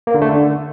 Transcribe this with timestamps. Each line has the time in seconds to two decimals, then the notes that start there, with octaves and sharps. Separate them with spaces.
0.07 A#3
0.14 D3
0.22 A3
0.29 D3